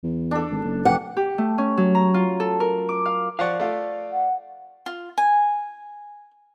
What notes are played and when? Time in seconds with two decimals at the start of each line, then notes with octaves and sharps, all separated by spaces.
0.04 E2
0.31 D4 A4
0.51 G#1
0.64 F#1
0.85 F1 E3 G4 F#5
1.17 G4
1.38 A3
1.58 C#4
1.77 F#3
1.95 A#5
2.14 F4
2.40 A4
2.60 A#4
2.89 D6
3.05 F5
3.39 F3 D5 F5 F#5 C#6
3.60 A3 F4
4.12 F#5
4.86 F4
5.18 G#5